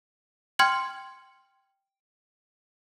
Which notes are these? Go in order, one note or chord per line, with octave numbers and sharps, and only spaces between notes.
G5 C6 F6 G#6 C#7 F#7